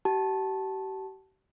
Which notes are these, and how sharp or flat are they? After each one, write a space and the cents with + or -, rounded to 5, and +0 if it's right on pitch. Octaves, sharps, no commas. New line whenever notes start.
G4 -40 A5 -10